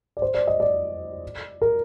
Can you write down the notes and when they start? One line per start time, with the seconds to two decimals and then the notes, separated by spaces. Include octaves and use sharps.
0.17 D5
0.22 C5
0.34 D5
0.47 D#5
0.60 D5
1.62 A#4